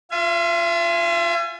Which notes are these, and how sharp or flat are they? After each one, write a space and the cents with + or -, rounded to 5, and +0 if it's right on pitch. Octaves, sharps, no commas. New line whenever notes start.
F4 +0 E5 +45 G#5 +0